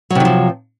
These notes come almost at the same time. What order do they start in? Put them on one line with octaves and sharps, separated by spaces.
F#3 C3 D#3 F3